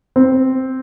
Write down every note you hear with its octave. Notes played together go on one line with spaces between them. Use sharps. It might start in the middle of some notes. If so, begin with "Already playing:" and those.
C4